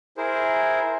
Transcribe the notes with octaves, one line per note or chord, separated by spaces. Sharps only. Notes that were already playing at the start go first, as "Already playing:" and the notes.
E4 G#4 A#4 C5